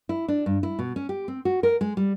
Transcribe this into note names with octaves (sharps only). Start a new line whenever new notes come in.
E4
D4
G2
E4
B2
C#4
G4
C4
F#4
A#4
G#3
G3